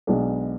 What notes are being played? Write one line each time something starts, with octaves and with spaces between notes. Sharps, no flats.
B1 B2 G#3 D4